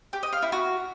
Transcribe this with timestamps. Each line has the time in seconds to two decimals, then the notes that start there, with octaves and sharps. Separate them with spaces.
0.13 G4
0.23 D#5
0.33 F5
0.42 E4
0.52 F#4